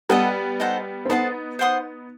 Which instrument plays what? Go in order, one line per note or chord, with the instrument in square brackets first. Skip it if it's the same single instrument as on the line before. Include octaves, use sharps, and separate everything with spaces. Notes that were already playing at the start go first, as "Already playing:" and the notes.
[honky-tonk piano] G3 B3 [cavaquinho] A4 D#5 F#5
[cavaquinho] D#4 A4 C5 F#5
[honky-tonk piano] C4
[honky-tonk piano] B3 D#4 [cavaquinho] A4 C5 F#5 A5
[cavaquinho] C5 F#5 C6 D#6